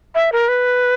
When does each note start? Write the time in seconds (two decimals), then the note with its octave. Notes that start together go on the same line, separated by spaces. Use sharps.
0.15 E5
0.32 A#4
0.48 B4